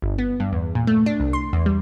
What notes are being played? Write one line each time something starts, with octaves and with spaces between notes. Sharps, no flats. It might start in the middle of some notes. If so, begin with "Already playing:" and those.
G1
B3
G2
E2
A#2
A3
D4
C2
C6
E2
G3